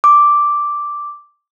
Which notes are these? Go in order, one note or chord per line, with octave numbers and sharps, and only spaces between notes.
D6